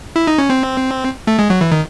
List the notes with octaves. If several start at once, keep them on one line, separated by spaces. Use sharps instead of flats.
E4
D#4
C#4
C4
A3
G#3
F#3
E3
D#3